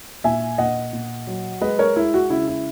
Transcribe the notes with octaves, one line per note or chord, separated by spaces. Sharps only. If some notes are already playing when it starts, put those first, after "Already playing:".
A#2 E5 G#5
A#2 D#5 F#5
A#2
F#3
G#3 B4 D#5
A#4 C#5
G#3 E4
F#4
C#3 E4
E4